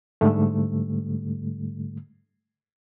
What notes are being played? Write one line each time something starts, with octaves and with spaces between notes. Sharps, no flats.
G#2 D3 G3 A3